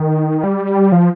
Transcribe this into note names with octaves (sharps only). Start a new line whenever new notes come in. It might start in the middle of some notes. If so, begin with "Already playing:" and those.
Already playing: D#3
G3
F3